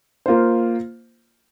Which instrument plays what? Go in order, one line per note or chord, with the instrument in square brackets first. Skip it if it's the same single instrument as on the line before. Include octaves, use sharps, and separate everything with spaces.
[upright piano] A#3 F4 C5